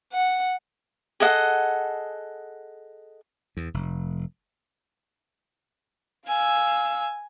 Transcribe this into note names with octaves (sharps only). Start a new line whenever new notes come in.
F#5
G#4 A4 D#5 F#5
E2
F1
F5 G#5 E6